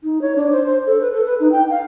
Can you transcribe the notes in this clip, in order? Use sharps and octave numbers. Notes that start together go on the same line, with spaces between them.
D#4
C#5
D4
C5
C5
A4
B4
A4
B4
D#4
G5
F5